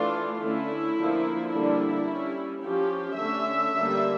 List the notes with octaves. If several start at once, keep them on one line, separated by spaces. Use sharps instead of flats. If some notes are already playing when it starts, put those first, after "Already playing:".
Already playing: E3 A3 D4 F4
D3 A3 C#4 E4
D3 F3 A#3
D3 G3 A#3 D4 E4
G3 C#4
F3 C#4 G4
D3 A3 C#4 E5
D3 G3 A#3